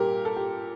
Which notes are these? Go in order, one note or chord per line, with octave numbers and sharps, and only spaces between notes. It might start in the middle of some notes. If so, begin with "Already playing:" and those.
Already playing: A#2 G3 G4 A#4
A4
G4